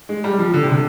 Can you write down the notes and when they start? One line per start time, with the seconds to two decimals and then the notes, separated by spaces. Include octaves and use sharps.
0.09 G#3
0.24 G3
0.39 F3
0.54 D3
0.63 C3
0.72 D3